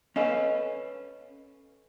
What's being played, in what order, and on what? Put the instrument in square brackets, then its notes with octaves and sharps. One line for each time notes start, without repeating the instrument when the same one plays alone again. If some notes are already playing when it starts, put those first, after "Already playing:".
[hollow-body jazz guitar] C#4 A4 B4 [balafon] D#5 F5 G#5